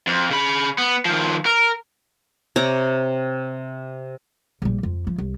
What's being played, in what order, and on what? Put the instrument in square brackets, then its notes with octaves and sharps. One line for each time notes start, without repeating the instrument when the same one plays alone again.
[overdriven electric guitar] F2
C#3 B5
B3
D#3 F3
A#4
[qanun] C3 C#5 A#5 D6
[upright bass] A#1 G3
F2
F3
C2